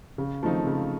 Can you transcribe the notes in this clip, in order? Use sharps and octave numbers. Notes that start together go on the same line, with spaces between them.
C#3
F3 A3 C4 D#4
C#3